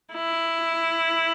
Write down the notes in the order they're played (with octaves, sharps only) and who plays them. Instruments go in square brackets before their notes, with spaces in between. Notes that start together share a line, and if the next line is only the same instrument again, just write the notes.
[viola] E4